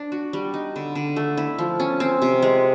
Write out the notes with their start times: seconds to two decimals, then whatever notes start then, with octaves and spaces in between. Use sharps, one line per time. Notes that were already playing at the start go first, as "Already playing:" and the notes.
Already playing: D4
0.12 F#4
0.33 G3
0.54 D#4
0.76 D3
0.95 D3
1.16 A3
1.37 E4
1.58 F3
1.80 C#4
2.00 C4
2.22 C3
2.42 G#3